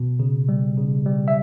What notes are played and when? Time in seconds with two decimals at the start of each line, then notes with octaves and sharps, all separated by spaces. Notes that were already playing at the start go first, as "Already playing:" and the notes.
Already playing: B2
0.19 C#3
0.49 G3
0.77 C#3
1.06 G3
1.28 E5